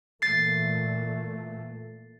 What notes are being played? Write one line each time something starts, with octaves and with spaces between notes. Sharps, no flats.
A#2 E3 A3 A6 C7